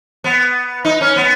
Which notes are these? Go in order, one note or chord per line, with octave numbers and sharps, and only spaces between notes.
B3
D#4
C#4
B3